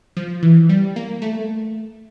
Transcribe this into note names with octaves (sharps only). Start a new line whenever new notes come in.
F3
E3
G3
A#3
A3